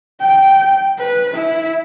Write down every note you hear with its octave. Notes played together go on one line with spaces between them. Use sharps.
G5
B4
E4